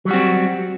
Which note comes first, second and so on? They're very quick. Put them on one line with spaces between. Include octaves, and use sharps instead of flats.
F#3 G3 F#4 C4